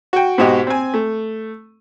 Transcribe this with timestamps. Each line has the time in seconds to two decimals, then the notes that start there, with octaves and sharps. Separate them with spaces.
0.13 F#4 G5
0.38 G#2 B2 F#4 G4 D#5
0.67 C4 G#5
0.94 A3